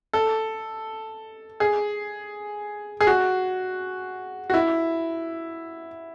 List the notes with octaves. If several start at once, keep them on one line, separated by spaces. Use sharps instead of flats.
A4
G#4
G#4
F#4
F#4
E4